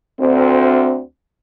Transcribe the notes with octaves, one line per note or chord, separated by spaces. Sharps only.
D2 C4